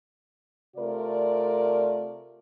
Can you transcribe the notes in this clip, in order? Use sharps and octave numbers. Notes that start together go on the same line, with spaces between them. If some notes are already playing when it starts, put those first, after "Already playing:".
C3 A3 F4 A#4 D5